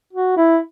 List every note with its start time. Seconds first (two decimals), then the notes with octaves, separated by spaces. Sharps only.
0.13 F#4
0.37 E4